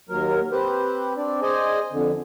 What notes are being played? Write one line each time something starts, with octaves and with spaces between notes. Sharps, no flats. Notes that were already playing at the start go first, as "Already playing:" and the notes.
D#2 F#3 A#4
C4 G4 B4 C5
C4 D4 D5
G#4 C5 D5 D#5 G#5
F2 D3